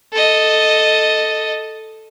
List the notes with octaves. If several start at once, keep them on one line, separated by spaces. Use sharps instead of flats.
A4 D#5